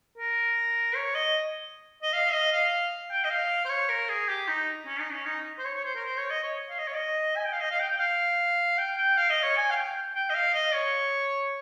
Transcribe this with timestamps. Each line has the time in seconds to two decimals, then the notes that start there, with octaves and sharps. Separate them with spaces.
0.18 A#4
0.95 C#5
1.15 D#5
2.03 D#5
2.13 F5
2.33 D#5
2.52 F5
3.11 G5
3.24 D#5
3.30 F5
3.65 C5
3.69 C#5
3.89 A#4
4.09 G#4
4.28 G4
4.48 D#4
4.87 C#4
5.00 D#4
5.13 C#4
5.26 D#4
5.58 C5
5.65 C#5
5.75 C#5
5.85 C5
5.95 A#4
6.04 C5
6.17 C#5
6.30 D#5
6.43 C#5
6.69 F5
6.78 D#5
6.87 C#5
6.96 D#5
7.36 G#5
7.44 G5
7.53 F5
7.60 D#5
7.70 F5
7.80 G5
7.90 G5
8.00 F5
8.78 G5
8.97 G5
9.17 F5
9.30 D#5
9.43 C#5
9.56 G#5
9.70 F5
9.76 G5
10.15 G5
10.29 D#5
10.34 F5
10.54 D#5
10.74 C#5